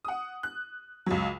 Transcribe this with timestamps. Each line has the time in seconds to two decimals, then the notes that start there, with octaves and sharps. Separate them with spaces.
0.05 F#5 D#6
0.43 F#6
1.06 C#2 F#3